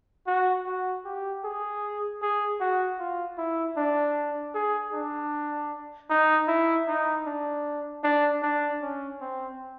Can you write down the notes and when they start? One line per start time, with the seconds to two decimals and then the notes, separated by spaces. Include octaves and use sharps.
0.27 F#4
0.66 F#4
1.05 G4
1.44 G#4
2.22 G#4
2.60 F#4
2.99 F4
3.38 E4
3.77 D4
4.54 G#4
4.93 D4
6.10 D#4
6.48 E4
6.88 D#4
7.26 D4
8.04 D4
8.42 D4
8.81 C#4
9.21 C4